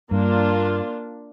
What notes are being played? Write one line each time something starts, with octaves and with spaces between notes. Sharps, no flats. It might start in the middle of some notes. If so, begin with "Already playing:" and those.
G2 A#3 D4 F4